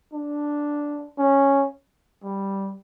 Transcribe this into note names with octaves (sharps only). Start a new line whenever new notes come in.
D4
C#4
G3